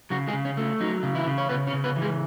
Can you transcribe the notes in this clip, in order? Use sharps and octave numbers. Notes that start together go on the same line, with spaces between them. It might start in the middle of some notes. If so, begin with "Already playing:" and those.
C#3 F#3 F#4
G#3 G#4
C#3
C#4
A3
F#3 D#4
C#3
E3 E4
C#3
C#5
C#3 B3 B4
C#4 C#5
C#3
B3 B4
E3
G#3 G#4